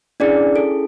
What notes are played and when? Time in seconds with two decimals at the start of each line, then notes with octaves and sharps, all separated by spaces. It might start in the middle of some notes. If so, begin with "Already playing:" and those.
0.20 C#4 D4 E4 G#4 D5
0.56 A4